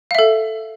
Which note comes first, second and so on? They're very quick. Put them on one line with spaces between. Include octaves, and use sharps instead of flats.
F5 E5 A4